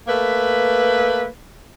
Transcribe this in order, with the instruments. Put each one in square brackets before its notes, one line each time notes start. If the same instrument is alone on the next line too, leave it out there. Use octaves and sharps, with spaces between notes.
[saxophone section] A3 A#3 B4